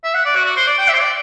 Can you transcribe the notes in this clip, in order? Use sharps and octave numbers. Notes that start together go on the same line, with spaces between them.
E5
F#5
D5
F#4
F#4
C5
D5
G5
E5
C5
D5